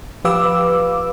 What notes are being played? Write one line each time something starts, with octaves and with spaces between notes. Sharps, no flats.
F3 G4 B4 F5 D6 E6